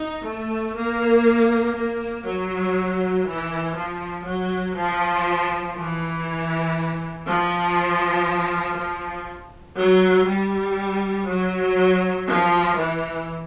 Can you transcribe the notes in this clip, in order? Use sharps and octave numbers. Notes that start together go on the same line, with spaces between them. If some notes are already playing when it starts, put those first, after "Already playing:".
Already playing: D#4
A3
A#3
A#3
F#3
E3
F3
F#3
F3
E3
F3
F3
F#3
G3
F#3
F3
E3